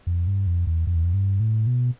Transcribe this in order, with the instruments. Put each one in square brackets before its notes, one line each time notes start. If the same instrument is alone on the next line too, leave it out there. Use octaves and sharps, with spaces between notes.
[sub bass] F2
G2
F2
E2
F2
E2
F2
G2
A2
B2